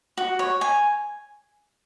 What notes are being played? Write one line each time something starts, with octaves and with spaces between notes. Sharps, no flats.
F#4
C#5
G#5